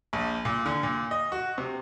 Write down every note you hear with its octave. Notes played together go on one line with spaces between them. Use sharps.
A#1
A#2
D3
A#2
D#5
F#4
C3